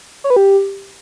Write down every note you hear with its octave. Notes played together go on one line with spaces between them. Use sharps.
C#5
B4
G4